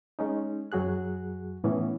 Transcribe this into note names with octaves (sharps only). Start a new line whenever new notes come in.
G#3 C#4 D#4
F#2 F#3 F#4 G#4 F#6
A2 E3 B3 C#4